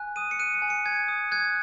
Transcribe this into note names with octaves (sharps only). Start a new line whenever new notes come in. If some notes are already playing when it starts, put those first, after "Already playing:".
Already playing: G#5 F#6
D#6 D#7
C#7
F#6 D#7
D#7
G#5
C#7
G#5 G#6
D#6
F#6 G#6